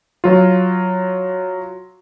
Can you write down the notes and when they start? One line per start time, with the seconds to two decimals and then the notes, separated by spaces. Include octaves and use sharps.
0.24 F#3 F4